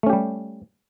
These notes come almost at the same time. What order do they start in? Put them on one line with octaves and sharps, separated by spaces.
A3 C#4 G4 G3